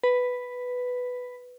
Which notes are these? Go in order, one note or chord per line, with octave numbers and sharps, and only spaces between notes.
B4